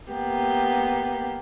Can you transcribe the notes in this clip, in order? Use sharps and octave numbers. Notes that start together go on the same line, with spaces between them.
A#3 B3 G4